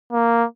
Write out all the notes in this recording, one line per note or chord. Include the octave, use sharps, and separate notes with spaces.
A#3